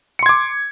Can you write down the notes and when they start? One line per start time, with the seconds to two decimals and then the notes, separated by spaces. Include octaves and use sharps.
0.19 C#7
0.23 C6
0.26 G#6
0.29 D6